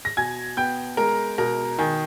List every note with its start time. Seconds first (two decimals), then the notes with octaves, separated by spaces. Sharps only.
0.05 A#6
0.17 B2 G#5 G#6
0.57 B3 G5 G6
0.97 G#3 A#4 A#5
1.38 B2 A#4 A#5
1.79 D#3 G#5